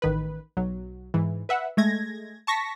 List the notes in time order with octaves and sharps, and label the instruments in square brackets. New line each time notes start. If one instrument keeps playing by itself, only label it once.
[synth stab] A1 D#3 B4
B1 F#3
G#2 E3
B4 E5 F#5
G#3 A3 G#6 A#6
A5 C#6 A#6 B6